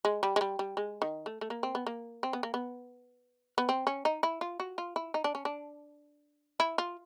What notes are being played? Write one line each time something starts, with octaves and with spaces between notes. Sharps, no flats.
G#3
G3
G#3
G3
G3
G#3
D#3
A3
A3
A#3
C4
B3
A#3
C4
B3
A#3
B3
B3
C4
C#4
D#4
E4
F4
F#4
F4
E4
D#4
D4
C#4
D4
E4
F4